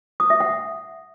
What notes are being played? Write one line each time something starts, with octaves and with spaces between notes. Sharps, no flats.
D#6
E5
F#5